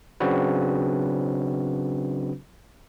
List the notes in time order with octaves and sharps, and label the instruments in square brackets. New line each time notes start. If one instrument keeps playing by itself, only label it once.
[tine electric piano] C#3 F#3 C4 D4 F#4 B4